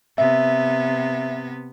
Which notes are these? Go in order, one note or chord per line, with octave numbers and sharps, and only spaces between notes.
C3 B3 E5